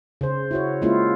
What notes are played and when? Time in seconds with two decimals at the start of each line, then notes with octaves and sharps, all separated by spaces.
0.21 C#3 C5
0.51 E4 F#4 C#5
0.82 G#3 A#3 C#4 E4 F4